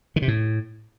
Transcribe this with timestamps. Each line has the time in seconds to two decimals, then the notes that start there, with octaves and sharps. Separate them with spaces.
0.16 D#3
0.22 C3
0.28 A2